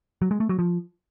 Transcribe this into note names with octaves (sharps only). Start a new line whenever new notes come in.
F#3
G#3
A3
F#3
F3